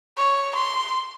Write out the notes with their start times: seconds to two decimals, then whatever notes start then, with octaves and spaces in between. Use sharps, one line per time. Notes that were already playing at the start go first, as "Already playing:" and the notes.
0.18 C#5
0.56 C6